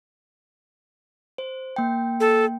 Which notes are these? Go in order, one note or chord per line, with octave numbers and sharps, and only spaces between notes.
C5
A#3 G5
A4